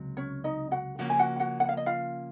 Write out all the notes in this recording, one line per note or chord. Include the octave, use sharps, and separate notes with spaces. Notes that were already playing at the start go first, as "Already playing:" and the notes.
Already playing: C#2 C3 F#3
C#4 C#5
D#4 D#5
F#4 F#5
C#3 F3 A#3 C#4 F#4 F#5
G#5
F#4 F#5
F#4 F#5
F#5
F5
D#5
F4 F5